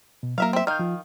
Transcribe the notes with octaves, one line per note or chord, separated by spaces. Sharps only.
B2
F#3 A#3 A#4 E5 F5
C4 E5
D#3 F5 F6 G6
F3 F4